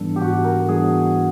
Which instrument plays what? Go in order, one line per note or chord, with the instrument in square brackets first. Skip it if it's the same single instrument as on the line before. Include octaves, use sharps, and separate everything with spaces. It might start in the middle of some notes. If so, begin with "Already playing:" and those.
Already playing: [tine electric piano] G#2 E3 G3 B3 D4 [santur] A4
[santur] G4
[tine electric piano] G#2 [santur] F#4
[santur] A#4
[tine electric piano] E3 G3 B3 D4 [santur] G#4